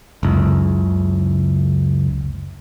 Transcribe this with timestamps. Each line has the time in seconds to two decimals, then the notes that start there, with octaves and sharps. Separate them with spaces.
0.23 F#1 C#2